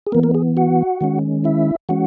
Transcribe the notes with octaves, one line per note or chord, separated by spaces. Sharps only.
G#4
E3 A#3 B3 A#4
A#3 A#4
G#4
F#4 F#5
D#3 G#3 C#4
E4 E5
E3 G#3 C#4 F#4 F#5